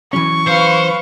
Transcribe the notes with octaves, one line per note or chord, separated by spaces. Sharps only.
E3 F#3 C#4 C#6
B4 C5 F5